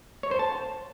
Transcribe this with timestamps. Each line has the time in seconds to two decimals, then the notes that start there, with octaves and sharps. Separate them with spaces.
0.23 C#5
0.31 C5
0.39 A5